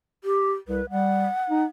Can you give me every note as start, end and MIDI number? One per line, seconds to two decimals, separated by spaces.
0.24 0.53 67
0.68 0.81 36
0.68 0.90 71
0.90 1.27 55
0.90 1.64 78
1.50 1.65 63